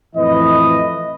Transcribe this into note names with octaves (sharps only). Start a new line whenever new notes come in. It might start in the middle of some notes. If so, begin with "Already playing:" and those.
F2 A2 E3 B4 D#5